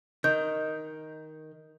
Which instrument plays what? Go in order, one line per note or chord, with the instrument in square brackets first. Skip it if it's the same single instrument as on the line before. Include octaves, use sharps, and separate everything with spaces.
[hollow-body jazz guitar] D#3 [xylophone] G6